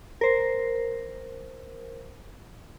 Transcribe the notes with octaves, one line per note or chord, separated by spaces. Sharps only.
A#4 C5